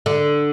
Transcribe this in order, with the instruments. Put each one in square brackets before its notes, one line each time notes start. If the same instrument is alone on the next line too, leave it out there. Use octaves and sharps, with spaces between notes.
[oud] D3